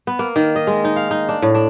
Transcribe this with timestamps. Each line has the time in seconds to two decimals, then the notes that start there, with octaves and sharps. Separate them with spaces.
0.07 B3
0.19 A#3
0.36 D#3
0.56 D#5
0.67 G#3
0.85 D#4
0.96 F5
1.11 D#4
1.29 D4
1.42 A2
1.55 D4